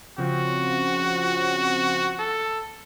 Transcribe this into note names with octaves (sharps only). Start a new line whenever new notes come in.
C#3 F3 C4 F#4
A4